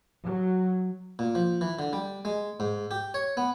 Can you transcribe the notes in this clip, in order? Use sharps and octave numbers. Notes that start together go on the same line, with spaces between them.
F#3
A#2
F3
E3
D3
G3
G#3
G#2
G4
C#5
B3